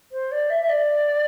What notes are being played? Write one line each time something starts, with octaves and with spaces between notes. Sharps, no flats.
C5
D5
E5
E5
D5